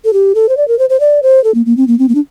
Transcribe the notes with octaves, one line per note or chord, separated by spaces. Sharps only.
A4
G4
A4
C5
D5
A#4
C5
C5
D5
C5
A4
A#3
A#3
C4
A#3
C4
A#3
D4